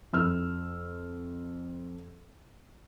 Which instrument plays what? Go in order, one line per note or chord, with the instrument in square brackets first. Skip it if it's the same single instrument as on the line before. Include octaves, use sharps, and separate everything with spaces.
[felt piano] F2 E6 F6